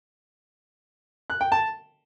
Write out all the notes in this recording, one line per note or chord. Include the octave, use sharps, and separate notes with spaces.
F#6
G5
A5